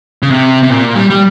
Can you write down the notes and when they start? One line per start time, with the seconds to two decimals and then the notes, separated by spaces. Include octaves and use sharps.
0.23 C#3
0.31 C3
0.63 C3
0.70 A#2
0.95 G3
1.10 G3